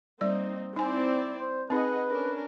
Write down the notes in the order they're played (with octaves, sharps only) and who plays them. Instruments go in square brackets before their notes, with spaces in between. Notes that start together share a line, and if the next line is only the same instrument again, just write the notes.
[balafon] G3 D5 [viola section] A#3 C4 D#4
[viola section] C4 E4 D5 [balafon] D#4 G#5
[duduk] C5
[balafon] C4 D#4 [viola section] G#4 D#5 F#5 [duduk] B4
[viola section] C#4 D4 A#4